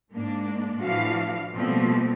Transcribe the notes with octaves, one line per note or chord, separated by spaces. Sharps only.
G#2 G#3 A#3 D4
A2 E3 F3 D4 F#4 F5
B2 F3 G3 A3 A#3 C4